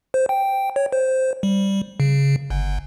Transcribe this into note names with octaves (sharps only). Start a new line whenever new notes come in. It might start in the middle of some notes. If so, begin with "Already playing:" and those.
C5
G5
C#5
C5
G3
C#3
G1